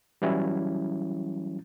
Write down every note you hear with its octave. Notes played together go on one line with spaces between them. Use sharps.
E3 F#3 G3 C#4 E4